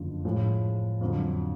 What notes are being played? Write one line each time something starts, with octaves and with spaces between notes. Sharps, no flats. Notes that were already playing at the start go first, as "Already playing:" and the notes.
Already playing: F#1 F2 D3 F3
A2 F3 G#3
F2 D3 F#3